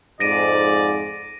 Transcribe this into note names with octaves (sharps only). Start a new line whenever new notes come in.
F2 G#2 D5 A#6 D7 D#7